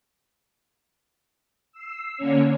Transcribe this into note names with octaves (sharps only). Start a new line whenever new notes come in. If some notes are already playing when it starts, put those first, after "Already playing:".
E6 C7
D3 A#3 C#4 C#5